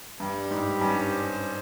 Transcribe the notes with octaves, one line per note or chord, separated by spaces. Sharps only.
G2 G3
G#2 G4
G2 C#4
C5